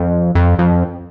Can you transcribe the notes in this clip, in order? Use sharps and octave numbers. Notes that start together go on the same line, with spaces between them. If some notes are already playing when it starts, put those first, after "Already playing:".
Already playing: F2
F2
F2